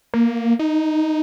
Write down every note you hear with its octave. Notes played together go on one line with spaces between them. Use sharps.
A#3
D#4